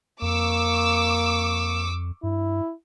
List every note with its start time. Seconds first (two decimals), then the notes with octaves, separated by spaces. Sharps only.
0.22 F2 A#3 C#6 D6 E6
2.23 G2 E4